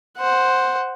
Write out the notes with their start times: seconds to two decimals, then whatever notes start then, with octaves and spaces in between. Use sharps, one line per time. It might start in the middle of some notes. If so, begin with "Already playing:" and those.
0.18 C5 F#5